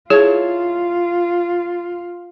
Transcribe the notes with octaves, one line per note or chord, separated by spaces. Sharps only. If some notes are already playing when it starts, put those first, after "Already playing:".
E4 F4 G#4 A4 C#5